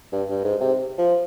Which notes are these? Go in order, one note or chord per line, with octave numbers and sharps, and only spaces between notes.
G2
G2
G#2
C3
F3